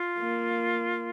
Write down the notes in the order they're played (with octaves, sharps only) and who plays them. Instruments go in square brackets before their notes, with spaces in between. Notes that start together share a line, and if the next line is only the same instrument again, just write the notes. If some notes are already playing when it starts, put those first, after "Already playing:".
Already playing: [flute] F4
[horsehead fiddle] A#3